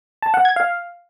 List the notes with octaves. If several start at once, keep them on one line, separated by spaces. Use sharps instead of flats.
A5
F#5
G#6
F5